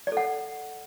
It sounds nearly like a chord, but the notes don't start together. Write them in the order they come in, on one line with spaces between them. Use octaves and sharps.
D5 A4 F#5